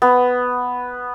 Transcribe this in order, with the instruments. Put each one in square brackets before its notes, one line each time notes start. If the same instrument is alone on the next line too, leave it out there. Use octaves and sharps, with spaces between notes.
[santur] B3